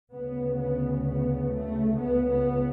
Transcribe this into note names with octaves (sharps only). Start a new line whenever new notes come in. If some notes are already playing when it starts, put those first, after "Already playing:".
D2 C#3 B3
B3
B3
A3
C#2 C#3 B3
B3